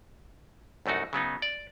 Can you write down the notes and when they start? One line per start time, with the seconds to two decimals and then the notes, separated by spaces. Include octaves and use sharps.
0.86 C2 F#2 A3 D#4 F#4
1.13 C#3 F#3 B3 D#4
1.42 D5